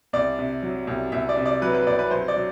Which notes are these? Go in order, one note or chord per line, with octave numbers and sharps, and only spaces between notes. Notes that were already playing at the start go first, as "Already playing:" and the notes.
C2 D5
C3
F#3
C2
C2 E5
D5
C3
D5
F#3 B4
B4
C2 D5
B4
F#3 C5
D5
F#3